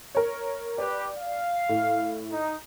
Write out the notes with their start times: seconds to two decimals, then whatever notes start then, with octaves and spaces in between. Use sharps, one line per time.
0.15 A#4 C#5
0.78 G4 B4 D5
1.15 F5
1.69 A2
2.32 D#4